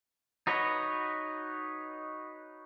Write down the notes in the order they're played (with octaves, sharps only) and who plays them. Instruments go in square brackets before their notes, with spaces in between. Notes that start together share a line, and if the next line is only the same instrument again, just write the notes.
[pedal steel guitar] D#4 F#4 B4 C#5 D#5